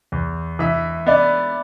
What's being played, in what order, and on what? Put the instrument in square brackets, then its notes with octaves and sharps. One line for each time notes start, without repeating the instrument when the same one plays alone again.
[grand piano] E2
[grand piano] E3 [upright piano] E5
[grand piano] B3 [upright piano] D5